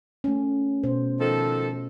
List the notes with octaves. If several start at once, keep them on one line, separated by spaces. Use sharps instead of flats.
A3 C#4
B2 C5
D#3 F3 A4